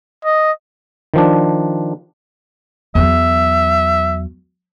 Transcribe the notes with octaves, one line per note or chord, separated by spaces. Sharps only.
D#5
D#3 F3 D4
E2 F#3 E5